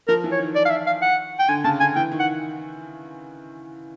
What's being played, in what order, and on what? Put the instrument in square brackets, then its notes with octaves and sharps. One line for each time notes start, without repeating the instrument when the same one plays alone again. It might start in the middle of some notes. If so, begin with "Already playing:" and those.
[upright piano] F3 [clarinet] A#4
[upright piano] E3
[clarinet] C#5
[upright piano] D#3
[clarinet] D5
F5
E5
F5
F#5
G5
[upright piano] D3 [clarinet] G#5
[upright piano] C#3 [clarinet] A5
[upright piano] D3 [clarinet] G#5
[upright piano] E3 [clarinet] G5
[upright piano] D#3
[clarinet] F#5